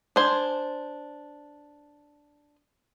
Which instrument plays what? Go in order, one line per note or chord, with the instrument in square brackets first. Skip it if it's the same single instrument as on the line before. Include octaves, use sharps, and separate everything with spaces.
[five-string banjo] D4 C5 G#5